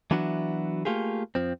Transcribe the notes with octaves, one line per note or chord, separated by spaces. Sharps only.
E3 F#3 B3 D4 E4 F#4
A3 A#3 F4 G4 G#4
F2 F3 C4